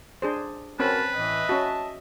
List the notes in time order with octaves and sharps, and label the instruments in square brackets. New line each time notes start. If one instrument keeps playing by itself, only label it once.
[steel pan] D4 G#4 C5
[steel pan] C4 C#4 B5 [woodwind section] F#4 A#4 [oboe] B4 [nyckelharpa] A5
[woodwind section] A2 E3 [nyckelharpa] D#5 E5
[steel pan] C#4 F#4 [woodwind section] A5